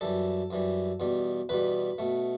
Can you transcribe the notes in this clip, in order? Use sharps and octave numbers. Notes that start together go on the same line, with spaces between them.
F#2 E3 G3 A4
F#2 E3 G3
E2 B2 G3
E2 B2 G3 B4
B2 A3